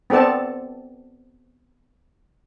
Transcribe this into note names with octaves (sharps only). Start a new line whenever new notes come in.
B3 C4 A4 D5 A5